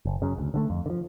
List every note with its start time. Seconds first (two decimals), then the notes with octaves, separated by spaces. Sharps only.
0.05 F#1
0.22 F#2 C#3
0.38 D2
0.54 D3 F3 A3
0.70 F2
0.86 D3
0.90 F3